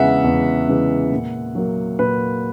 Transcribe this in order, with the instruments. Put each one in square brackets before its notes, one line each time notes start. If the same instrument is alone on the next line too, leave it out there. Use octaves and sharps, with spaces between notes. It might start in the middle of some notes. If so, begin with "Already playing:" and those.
Already playing: [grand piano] E2 C#3 E3 G#3 E5 F#5
E2
C#3 E3 G#3
A#2
F#3 A#3
A#2 B4